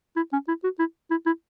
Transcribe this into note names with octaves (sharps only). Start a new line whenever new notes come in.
E4
C#4
E4
F#4
E4
E4
E4